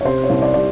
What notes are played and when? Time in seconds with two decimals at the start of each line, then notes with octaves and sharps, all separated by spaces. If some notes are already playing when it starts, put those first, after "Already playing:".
0.01 C#5
0.04 C3 C5
0.23 C#5
0.30 C2
0.42 D5
0.54 C3 D5